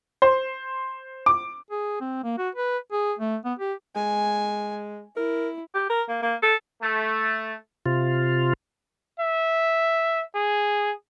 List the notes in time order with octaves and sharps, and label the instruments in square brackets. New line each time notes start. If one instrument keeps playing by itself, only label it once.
[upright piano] C5
D6
[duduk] G#4
C4
A#3
F#4
B4
G#4
A3
B3
G4
[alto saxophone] G#3 [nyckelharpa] G#5
[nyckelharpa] E4 [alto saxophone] A#4
[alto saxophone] G4
A#4
A#3
A#3
A4
[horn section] A3
[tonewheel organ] C3 F4
[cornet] E5
G#4